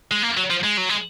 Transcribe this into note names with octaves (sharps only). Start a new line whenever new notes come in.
G#3
A#3
F#3
F3
G#3
F#3
G#3